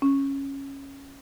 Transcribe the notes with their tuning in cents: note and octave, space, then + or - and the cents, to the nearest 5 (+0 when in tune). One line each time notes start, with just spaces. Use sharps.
C#4 -10